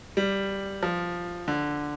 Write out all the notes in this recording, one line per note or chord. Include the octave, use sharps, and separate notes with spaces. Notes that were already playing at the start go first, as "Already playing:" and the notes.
G3
F3
D3